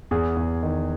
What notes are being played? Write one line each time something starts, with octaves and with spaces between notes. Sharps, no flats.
E2 G#4
E2
D#3